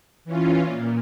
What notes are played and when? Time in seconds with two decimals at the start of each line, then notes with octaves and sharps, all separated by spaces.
0.25 E3 C#4 F4
0.64 A#2